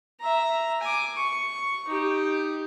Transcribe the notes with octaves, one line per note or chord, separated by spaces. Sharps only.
E5 A#5
G#5 D6
C#6
D#4 G4